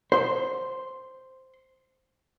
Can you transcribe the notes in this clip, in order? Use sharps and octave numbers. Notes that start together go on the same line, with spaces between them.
C5 C6